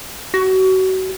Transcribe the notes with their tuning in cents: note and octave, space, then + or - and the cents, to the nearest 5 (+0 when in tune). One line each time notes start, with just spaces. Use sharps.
F#4 +30